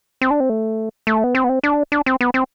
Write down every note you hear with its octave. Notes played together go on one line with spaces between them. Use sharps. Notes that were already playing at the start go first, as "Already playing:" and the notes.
C4
D4
C4
A3
A3
B3
C4
B3
C4
D4
D4
C4
B3
C4